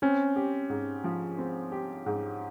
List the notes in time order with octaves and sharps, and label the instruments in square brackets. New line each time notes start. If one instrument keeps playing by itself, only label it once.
[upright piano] C4 [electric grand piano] C#4
[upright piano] G4
G#2
F3
C4
G4
G#2